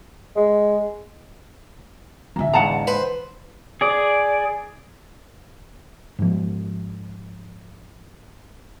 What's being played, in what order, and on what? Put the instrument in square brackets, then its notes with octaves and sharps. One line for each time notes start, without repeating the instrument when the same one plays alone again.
[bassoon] G#3
[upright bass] A1 D3 [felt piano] E5 G#5 A#5
[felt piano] E2 G#2 F5 [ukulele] F#5 A5 A#5
[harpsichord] B4 C5
[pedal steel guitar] G#4 D5
[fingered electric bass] G#2 F3